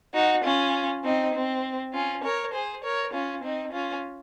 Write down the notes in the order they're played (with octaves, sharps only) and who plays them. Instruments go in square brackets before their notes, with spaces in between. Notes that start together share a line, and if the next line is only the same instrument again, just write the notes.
[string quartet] D#4 F#4
C#4 F4
C4 D#4
C4
C#4 F4
A#4 C#5
G#4 C5
A#4 C#5
C#4 F4
C4 D#4
C#4 F4